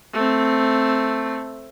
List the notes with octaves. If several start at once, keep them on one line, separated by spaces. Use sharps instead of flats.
A3 C4